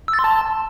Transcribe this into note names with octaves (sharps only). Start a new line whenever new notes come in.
E6
A6
C6
A5